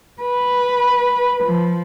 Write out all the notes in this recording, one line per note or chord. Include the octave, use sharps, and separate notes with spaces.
B4
F3